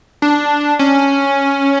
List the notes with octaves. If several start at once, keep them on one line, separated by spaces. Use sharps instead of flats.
D4
C#4